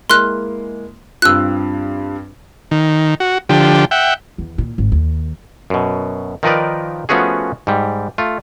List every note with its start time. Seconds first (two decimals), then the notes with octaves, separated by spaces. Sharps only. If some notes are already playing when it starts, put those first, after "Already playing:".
0.10 G#3 A#3 E4 C6 F6 F#6
1.22 G2 C4 F4 E6 F#6
2.71 D#3
3.20 F#4
3.49 D3 F3 G4
3.91 E5 F#5 G5
4.38 E2
4.58 A#2
4.78 G#1
4.92 D#2
5.70 F#2 B2
6.43 D#3 F3 D#4 A#4 B4 D5
7.09 F3 A3 B3 C#4 F#4 G#4
7.67 G#2 G3
8.18 A3 F4